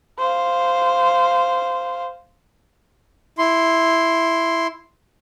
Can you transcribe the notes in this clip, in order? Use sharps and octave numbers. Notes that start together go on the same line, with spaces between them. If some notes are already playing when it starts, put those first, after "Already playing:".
C5 F5
E4 C6